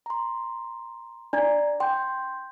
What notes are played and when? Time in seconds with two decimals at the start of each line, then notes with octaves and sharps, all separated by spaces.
0.06 A#5 C6
1.33 D4 D5 A#5 G#6
1.80 G5 C6 G6